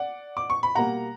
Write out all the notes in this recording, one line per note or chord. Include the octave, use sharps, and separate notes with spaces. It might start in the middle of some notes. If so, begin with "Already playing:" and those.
Already playing: D5 F#5
D6
C#6
B5
B2 G3 A#3 F#5 A#5